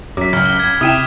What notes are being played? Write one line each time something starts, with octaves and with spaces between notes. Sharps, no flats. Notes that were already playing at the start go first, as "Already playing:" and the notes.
F#2 F#3 D6 B6
C#2 F6
G7
G#6
C3 E4 G5 D#6 D#7 E7